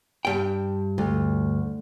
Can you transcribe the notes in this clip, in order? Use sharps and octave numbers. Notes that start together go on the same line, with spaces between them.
G2 G5
D2